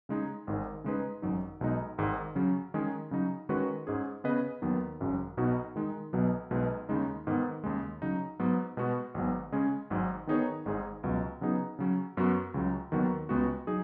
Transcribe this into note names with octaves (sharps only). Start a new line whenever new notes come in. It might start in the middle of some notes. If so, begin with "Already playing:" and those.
C#3 G#3 D#4 G#4
G#1 G#2 D#3
C#3 G#3 D#4 G#4 B4
G#1 F#2 F#3 D#4
B1 B2 G#3 D#4
G#1 G#2 D#3 G#3
C#3 F#3 C#4
D#3 G#3 C#4 G#4
C#3 F#3 D#4
D#3 G#3 C#4 F#4 B4
G#2 G#3 C#4 G#4
C#3 B3 G#4 B4 D#5
D#2 D#3 F#3 B3
G#1 F#2 C#3 F#3
B1 B2 B3 D#4 F#4
D#3 G#3 D#4
B1 B2 F#3 B3
B1 B2 G#3 D#4 B4
D#2 C#3 G#3 D#4
G#2 D#3 B3
D#2 C#3 G#3
C#3 F#3 D#4
G#2 F#3 B3
B2 G#3 B3 F#4
G#1 G#2 F#3 B3
C#3 G#3 C#4 G#4 D#5
G#1 G#2 F#3
D#3 B3 D#4 G#4 C#5
G#1 G#2 G#3 D#4 G#4
C#2 B2 F#3
C#3 F#3 B3 D#4 G#4
C#3 F#3 C#4
F#2 F#3 B3 F#4
C#2 C#3 F#3
D#2 D#3 F#3 B3 F#4
C#2 C#3 G#3 B3 F#4
F#3 D#4 G#4